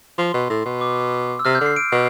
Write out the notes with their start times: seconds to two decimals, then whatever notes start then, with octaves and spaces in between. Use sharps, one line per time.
0.18 F3 C6
0.34 B2
0.50 A2
0.65 B2
0.81 D6
1.39 E6
1.45 C3 F6
1.55 G6
1.61 D3
1.66 C7
1.76 D7
1.92 B2